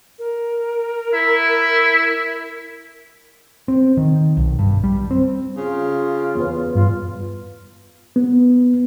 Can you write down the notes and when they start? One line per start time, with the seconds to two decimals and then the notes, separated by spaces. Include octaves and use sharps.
0.18 A#4
1.14 E4
3.68 C4
3.97 D#3
4.37 B1
4.59 G2
4.84 G3
5.11 C4
5.57 C#3 F4
6.35 E2 B4
6.75 G2 F4
8.16 B3